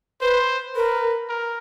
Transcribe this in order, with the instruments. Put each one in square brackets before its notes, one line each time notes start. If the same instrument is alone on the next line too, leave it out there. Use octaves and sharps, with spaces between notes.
[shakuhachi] B4 [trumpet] C5
[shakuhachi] A#4 [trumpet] B4
[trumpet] A#4